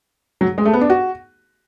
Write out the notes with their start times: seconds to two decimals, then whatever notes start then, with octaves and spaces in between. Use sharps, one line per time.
0.41 F#3
0.58 G#3
0.65 A3
0.73 B3
0.81 D4
0.90 F#4